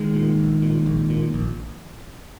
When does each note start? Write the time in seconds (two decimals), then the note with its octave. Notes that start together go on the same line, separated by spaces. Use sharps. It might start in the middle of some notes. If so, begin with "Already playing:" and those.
Already playing: D#3 G#3
0.14 A#2
0.38 A#1
0.62 A#2
0.86 A#1
1.10 A#2
1.34 A#1